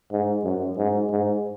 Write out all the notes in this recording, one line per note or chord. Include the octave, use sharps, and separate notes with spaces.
G#2
F#2
G#2
G#2